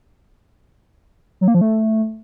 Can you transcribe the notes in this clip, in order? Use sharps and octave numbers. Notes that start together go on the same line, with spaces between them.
F#3
A#3
F3
A3